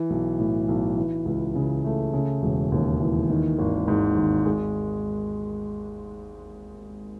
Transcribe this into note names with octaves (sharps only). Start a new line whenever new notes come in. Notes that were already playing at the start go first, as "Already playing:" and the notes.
Already playing: E3
B1
A2
B1
E3
C#2
C#3
A3
C#3
E1
D#2
E3
D#3
G#1
G#2
G#1
G#3